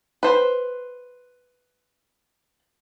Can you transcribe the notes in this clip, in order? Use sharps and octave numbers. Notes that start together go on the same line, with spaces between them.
B4 C5